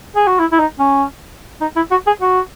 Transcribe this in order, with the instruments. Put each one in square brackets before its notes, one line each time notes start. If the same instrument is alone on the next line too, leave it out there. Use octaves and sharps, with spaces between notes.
[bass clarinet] G#4
F#4
E4
E4
D#4
C#4
D#4
E4
F#4
G#4
F#4